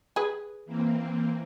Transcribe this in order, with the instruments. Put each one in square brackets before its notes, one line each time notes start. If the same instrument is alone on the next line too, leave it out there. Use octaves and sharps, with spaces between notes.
[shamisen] G#4 B4
[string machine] E3 A#3 C4